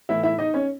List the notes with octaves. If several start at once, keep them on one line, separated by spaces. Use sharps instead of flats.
A2 E3 E4 E5
E4 E5
D#4 D#5
C#4 C#5